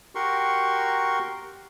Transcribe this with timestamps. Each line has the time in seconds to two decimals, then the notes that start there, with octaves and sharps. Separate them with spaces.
0.15 F#4 G4 A#4 C6 C#6